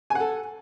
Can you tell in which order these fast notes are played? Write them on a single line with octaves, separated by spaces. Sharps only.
G#5 F#5 A4